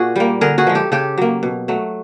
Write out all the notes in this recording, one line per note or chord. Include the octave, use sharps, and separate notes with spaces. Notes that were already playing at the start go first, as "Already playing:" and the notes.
Already playing: A#2 F#4 G#4
G3 A#3
D3 G#4 A#4
F#4 G#4
F3 G#3
G4 A4
C#3 G4 A4
F#3 A#3
B2
F#3 A3